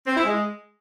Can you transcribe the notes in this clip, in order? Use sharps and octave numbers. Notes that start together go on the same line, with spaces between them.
C4
E4
G#3